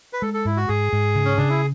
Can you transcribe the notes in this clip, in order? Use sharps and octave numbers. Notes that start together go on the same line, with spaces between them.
B4
G#3 A4
A4
G#2 E4
F#4
G#2 G#4
G#2
C#3
C#4
C#3 D4
E4